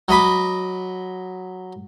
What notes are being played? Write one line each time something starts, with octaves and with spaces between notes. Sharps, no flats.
F#3 D#5 B5 D6